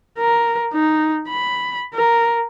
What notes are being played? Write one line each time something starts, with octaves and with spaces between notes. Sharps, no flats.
A#4
D#4
B5
A#4